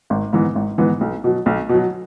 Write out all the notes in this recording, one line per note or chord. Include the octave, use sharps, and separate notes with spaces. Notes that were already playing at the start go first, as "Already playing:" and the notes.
G#1
G#2 E3 B3
G#1
G#2 E3 B3
B1
B2 F#3
B1
B2 F#3